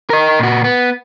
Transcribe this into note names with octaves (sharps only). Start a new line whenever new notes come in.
A#4 D#5
A#2 F#4
B3